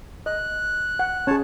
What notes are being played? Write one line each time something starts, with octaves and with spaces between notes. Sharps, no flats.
D#5 F#6
F#5
C#4 G#4 C#5 A5